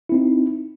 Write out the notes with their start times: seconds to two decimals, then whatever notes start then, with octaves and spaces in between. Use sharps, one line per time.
0.09 E4
0.12 C4
0.14 D#4